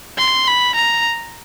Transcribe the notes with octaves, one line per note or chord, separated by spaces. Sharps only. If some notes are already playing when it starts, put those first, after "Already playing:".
C6
B5
A#5